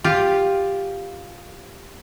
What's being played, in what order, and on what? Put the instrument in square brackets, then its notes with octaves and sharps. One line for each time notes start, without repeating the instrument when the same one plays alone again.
[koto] F4 G4